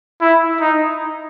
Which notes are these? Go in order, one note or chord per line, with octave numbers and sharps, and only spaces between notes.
E4
D#4